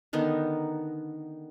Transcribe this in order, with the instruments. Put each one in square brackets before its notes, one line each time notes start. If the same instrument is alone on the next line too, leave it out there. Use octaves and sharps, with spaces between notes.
[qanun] D3 D#3 B3 D#4